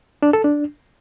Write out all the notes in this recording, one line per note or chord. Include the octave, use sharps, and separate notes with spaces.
D4
A4
D4